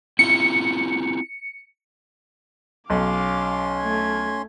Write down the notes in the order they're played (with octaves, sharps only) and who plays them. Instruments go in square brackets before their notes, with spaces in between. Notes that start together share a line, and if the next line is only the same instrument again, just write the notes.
[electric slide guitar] C4 E4 F4 [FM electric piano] C#7
[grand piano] B1 [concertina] C#4 C6 [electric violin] F5 D6
[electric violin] A3 G#6